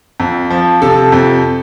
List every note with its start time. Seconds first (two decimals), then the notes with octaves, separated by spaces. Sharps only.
0.20 F2
0.50 F3
0.82 C3 A4
1.12 F2